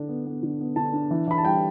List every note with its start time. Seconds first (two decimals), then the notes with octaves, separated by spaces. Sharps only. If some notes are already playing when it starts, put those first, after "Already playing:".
Already playing: D3 D4
0.08 B3
0.26 B3
0.43 D3
0.60 B3
0.76 D3 A5
0.94 D4
1.11 E3
1.27 E3 B5
1.38 A5
1.45 G3 G5